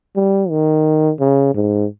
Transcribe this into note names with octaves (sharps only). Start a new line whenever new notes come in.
G3
D#3
C#3
G#2